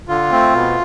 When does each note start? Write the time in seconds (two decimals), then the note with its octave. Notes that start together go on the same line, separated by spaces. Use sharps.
0.08 D3 F4
0.31 A3 C4
0.54 B2